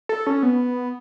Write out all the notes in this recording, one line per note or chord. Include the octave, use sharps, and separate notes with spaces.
A4
C#4
B3